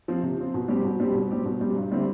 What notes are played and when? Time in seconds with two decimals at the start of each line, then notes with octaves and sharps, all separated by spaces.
0.08 F3 C4
0.23 C3
0.38 F3 C4
0.54 B2
0.68 G3 C4 G4
0.84 B2
1.00 G3 C4 G4
1.15 B2
1.31 G3 C4 G4
1.45 B2
1.61 G3 C4 G4
1.76 G2
1.91 D3 G3 C4 E4